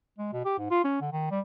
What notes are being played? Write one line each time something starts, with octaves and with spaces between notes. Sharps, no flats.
G#3
B2
G4
G#2
F4
C#4
D3
D#3
G3